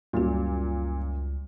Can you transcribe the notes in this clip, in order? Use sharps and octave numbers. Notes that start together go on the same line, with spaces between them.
C#2 F#2 A#2 G3 A#3 F#4